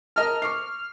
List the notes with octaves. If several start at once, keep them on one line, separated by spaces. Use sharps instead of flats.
A#4 D#5 A5 F6
C#6 D6 C7